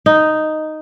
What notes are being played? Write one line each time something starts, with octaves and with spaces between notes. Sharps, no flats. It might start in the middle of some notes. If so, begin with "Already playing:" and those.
D#4